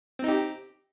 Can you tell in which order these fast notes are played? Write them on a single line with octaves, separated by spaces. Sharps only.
C4 D#4 G4